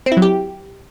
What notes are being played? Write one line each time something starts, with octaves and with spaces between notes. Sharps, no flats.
C4
E4
F#3
G4